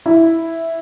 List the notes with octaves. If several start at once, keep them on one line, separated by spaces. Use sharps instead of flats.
E4